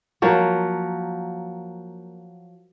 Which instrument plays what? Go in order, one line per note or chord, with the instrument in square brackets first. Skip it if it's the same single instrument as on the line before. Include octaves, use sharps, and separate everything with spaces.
[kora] F3 F#3 A#3